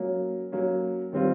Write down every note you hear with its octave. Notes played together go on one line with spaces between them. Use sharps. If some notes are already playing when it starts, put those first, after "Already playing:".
Already playing: F#3 A#3 C#4
F#3 A#3 C#4
D#3 G3 C4 F4